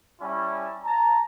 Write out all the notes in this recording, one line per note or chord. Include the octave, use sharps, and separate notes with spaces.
G3 C#4 E4 A5
A5 A#5